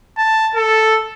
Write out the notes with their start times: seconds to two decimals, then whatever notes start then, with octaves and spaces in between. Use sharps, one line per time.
0.17 A5
0.55 A4